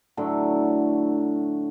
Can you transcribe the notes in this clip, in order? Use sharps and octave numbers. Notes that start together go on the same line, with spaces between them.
A2 D3 F#3